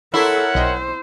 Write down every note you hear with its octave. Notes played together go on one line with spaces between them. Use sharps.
E4 A4 A#4 C#5 F#5 C6 C#6 C7
B1 C5 D#5 G5